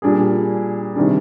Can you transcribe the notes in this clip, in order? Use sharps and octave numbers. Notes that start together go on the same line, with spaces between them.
A#2 G3 D4 G#4
C3 D#3 G3 D4